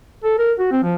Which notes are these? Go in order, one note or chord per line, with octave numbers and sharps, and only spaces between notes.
A4
A#4
F#4
C4
F3